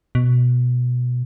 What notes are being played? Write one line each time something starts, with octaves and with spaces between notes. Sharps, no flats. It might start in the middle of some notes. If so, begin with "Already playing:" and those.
B2